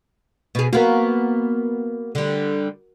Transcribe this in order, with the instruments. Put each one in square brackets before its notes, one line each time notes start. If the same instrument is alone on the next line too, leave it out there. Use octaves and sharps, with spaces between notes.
[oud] B2 G#4
[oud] A#3 B3 [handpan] F#4 A#4
[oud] D3 G3